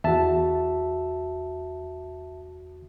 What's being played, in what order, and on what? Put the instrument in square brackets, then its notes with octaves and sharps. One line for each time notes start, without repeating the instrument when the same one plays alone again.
[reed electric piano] E2 F#4 [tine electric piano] E5 A5